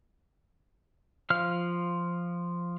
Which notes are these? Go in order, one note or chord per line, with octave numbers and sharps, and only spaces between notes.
F3 F5 F6